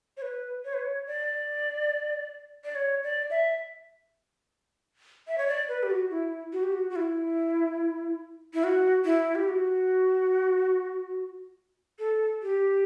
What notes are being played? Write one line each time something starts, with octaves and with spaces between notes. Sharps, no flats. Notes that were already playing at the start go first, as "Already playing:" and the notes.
C#5
B4
C#5
B4
C#5
D5
D5
C#5
D5
E5
E5
C#5
D5
B4
G4
F#4
E4
F#4
G4
F#4
F#4
E4
E4
F#4
E4
G4
F#4
A4
G4